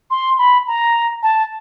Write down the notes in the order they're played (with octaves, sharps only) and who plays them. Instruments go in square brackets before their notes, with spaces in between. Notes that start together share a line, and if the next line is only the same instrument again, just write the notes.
[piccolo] C6
B5
A#5
A5